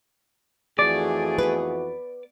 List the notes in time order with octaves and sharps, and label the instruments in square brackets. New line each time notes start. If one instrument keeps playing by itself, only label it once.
[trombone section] F2 E3 F#4 [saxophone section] A3 G#4 [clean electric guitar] D5
[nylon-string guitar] B3 B4